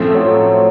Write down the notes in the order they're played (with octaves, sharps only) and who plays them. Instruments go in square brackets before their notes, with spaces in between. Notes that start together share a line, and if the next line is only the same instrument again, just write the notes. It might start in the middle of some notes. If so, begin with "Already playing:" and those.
Already playing: [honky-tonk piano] A2 F3 A3 C4
[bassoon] F#3